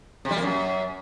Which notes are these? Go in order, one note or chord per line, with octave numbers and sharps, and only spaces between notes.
C3
G3
A#3
F#2